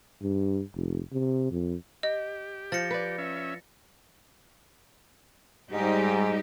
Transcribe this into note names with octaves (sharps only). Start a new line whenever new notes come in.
G2
F1
C3
F2
G4 D#5
F3 A6 A#6 C#7
B4 D5
C#4 E5
G#2 G3 D#4 G4